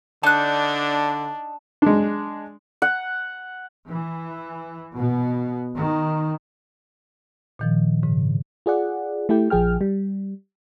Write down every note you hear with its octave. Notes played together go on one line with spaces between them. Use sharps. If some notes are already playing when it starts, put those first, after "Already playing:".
D3 D4 D#4 A5 F#6
G#3 D4
F#5
E3
B2
D#3
A#2 D#3 F3
G#2 C#3
F4 G#4 D5 F#5
A3 E4 G4 G5
A#1 F3 G#4 G5 F6
G3